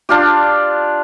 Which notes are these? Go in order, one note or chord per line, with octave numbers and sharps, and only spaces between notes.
D4 F4 G4